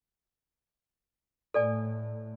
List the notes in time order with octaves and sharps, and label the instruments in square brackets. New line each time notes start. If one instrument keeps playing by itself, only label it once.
[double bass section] A2 [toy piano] A4 D5 G#5